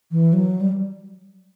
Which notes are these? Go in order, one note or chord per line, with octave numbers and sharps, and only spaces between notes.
E3
F#3
G3